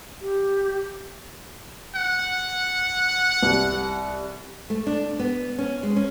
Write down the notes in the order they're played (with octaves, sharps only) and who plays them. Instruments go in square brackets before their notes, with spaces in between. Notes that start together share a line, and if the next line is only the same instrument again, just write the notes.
[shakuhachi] G4
[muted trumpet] F#5
[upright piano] C2
[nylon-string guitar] A3
D4
B3
C#4
G#3
C#4